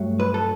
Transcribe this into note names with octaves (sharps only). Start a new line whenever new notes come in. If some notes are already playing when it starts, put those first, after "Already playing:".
Already playing: G2 F#3 A3
B4
A4